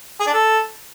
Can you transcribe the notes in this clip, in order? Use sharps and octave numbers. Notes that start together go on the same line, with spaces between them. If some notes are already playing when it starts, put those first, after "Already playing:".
G#4
D4
A4